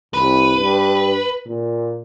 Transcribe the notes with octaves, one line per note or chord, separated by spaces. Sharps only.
C2 B4
G2
A#2